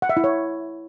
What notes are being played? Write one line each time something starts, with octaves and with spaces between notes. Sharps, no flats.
F#5
E5
E4
C#5